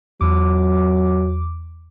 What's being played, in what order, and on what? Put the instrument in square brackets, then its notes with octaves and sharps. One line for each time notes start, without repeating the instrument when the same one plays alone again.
[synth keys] E2 D6 [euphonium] F#3